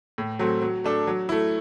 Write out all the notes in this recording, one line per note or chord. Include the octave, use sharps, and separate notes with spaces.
A2
F#3 A3 C4
F#3
A3 D4 A4
F#3
A3 E4